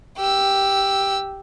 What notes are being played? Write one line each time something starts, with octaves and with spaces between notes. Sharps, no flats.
G4 E6